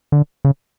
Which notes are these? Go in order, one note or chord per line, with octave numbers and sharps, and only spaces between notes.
D3
C#3